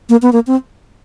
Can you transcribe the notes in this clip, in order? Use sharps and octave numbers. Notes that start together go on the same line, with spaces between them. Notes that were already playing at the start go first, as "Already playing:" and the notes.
A#3
B3
A#3
C4